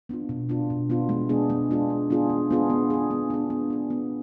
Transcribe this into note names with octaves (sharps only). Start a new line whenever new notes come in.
B3 D4 F4
B2
B3 D4 F4
B2
B3 D4 F4
G#3
B3 D4 F4 G#4
G#3
B3 D4 F4 G#4
G#3
B3 D4 F4 G#4
G#3
B3 D4 F4 G#4
B3
D4 G#4
B3
D4 G#4
B3
D4 G#4
B3